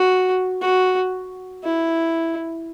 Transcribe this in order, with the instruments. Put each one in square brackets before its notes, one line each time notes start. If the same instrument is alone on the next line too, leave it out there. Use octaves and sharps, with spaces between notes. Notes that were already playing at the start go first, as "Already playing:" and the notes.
Already playing: [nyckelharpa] F#4
F#4
E4